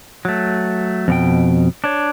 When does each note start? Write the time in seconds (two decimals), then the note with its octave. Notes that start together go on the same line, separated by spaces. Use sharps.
0.25 F#3 A3
1.08 F2 B2 G5
1.84 D4 C#5